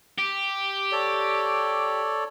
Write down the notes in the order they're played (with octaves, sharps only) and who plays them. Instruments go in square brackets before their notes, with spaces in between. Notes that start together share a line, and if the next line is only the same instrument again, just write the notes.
[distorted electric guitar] G4
[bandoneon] A4 C#5 D5